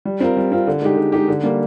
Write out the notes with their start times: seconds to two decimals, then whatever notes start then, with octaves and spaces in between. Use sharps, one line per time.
0.05 G3
0.20 C4 F4 A#4
0.37 G3
0.52 C4 F4 A#4
0.67 D3
0.82 G#3 D#4 G4
0.97 D3
1.12 G#3 D#4 G4
1.28 D3
1.43 G3 A#3